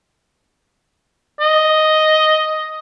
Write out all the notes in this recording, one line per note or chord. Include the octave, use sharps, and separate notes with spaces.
D#5